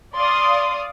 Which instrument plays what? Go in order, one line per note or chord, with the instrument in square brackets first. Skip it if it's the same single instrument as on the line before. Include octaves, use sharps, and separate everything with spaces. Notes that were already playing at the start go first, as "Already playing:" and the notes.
[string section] D5 F5 D#6 [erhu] C6